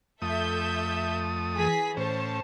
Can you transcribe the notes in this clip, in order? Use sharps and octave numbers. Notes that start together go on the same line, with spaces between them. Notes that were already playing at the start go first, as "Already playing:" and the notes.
F2 A3 A4 E5 D#6 G6
E3 G#4 B6
A2 C#4 C5 A5